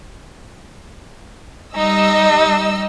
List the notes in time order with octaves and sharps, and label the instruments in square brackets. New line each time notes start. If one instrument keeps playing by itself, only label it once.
[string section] G3 D#5 E6 [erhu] D#4